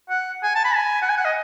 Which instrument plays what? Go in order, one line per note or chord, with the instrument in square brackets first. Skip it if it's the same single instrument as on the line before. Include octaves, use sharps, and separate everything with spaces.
[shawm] F#5
G#5
A5
B5
G#5
F#5
G#5
F#5
D#5